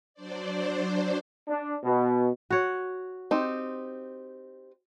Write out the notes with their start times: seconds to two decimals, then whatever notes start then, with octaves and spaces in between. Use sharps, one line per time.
0.14 F#3 D4 C5 D5
1.48 D4
1.84 B2
2.50 F#4 C#5
3.31 C4 D#4 G4